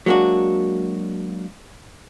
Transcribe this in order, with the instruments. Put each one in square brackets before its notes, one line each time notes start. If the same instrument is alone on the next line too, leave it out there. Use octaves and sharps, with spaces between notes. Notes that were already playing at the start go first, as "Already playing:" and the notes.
[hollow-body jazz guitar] F#3 G#3 A#3 D4 F#4